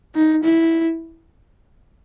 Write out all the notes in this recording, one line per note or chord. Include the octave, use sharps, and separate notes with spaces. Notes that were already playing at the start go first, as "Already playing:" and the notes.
D#4
E4